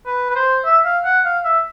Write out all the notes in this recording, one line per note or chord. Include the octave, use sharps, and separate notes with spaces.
B4
B4
C5
E5
F5
F#5
F5
E5